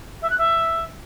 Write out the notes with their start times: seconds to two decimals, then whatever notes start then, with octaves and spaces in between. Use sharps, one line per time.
0.22 E5
0.30 F#6
0.38 E5